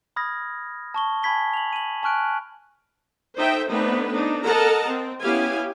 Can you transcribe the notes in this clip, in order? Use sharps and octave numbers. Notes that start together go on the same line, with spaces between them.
B5 D#6 F6 G#6 A#6
A5 C#6 G7
G#5 A5 B5 G#6 B6 G7
F7 F#7
D#7 F#7
G#5 A5 C#6 F6 F#6 D7
D#4 A4 C5 E5 G5
A3 B3 C4 D4 D#4 B4
D4 D#4
A4 A#4 D#5 F#5 A5 A#5
C4
B3 C#4 E4 G4 F5 G#5